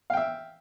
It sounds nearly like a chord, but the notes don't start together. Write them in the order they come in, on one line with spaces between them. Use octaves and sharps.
F5 G5 E5